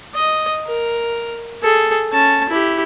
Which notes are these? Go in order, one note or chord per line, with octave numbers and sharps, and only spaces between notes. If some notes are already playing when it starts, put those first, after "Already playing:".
D#5
A#4
G#4 A4
C#4 A5
E4 G4